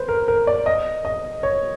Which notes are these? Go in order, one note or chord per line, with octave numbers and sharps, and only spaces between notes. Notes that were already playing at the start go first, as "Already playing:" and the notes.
Already playing: B4 C5
A#4
A#4
D5
D#5
D#5
C#5